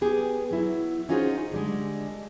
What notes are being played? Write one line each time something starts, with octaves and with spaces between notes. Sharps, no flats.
B3 G4 G#4
F#3 E4
C#4 D#4 F4 F#4 G#4 C5
D3 G3 G#3